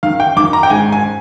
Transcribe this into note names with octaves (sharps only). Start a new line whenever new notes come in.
D#3 F5
G5
D#3 D6
A#5
G5
G#2 G#5
G#5